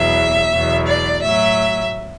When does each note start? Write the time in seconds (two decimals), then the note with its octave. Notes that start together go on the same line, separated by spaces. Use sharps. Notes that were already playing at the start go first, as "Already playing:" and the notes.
Already playing: E2 B2 F#3 E5
0.52 E2 B2 F#3
0.87 D5
1.21 A2 F#3 E5